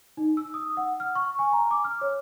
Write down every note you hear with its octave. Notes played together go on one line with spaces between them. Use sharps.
D#4
E6
D#6
F#5
F6
C#6
G#5
A#5
D6
F6
C#5